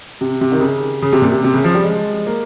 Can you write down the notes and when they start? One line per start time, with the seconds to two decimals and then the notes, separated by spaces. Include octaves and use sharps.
0.21 C3
0.41 C3
0.52 D#3
0.61 C#3
1.02 C#3
1.13 C3
1.22 A#2
1.32 C3
1.44 C3
1.54 C#3
1.64 F3
1.74 G3
1.84 G#3
2.27 A#3